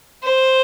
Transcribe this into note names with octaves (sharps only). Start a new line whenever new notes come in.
C5